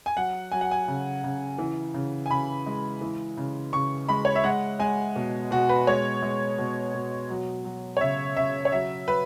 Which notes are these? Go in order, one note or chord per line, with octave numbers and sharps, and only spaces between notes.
G#5
F#3 F#5
F#3 G#5
F#5
G#5
C#3
C#3
E3
C#3
G#5
C#3 B5
G#3
E3
C#3
C#3 C#6
G#3 B5
C#5
E5
G#3 F#5
G#3 G#5
B2
B2 F#4
B4
G#3 C#5
G#3
B2
B2
F#3
F#3
C#5
C#3 E5
C#3 E5
C#5
F#3 E5
F#3 B4